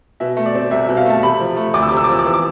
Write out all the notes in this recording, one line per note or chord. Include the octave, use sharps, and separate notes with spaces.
B2 E5
A3
D5
C4
C2 E5
E5
B2
F5
A3 A5
C3 B5
F3
A3
D2 D6
E6
C3 D6
E6
D6
F3 E6
D6
E3 E6
D6